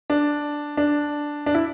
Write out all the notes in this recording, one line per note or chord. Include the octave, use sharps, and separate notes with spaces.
D4
D4
D4
E4